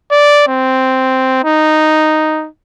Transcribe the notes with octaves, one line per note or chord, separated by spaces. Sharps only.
D5
C4
D#4